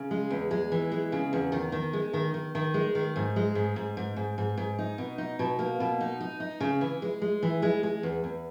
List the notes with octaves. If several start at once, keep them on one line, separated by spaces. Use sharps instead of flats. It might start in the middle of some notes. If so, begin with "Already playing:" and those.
Already playing: C#3
G#3
E2
G#3
E3
G#3
C#3
E2
D#3
D#3
G#3
D#3
D#3
D#3
G#3
D#3
G#2
G#3
G#2
G#2
G#2
G#2
G#2
G#2
D#4
B2
D#4
B2
A#3
B2
D#4
D#4
D#4
C#3
E3
G#3
G#3
E3
G#3
G#3
E2
E2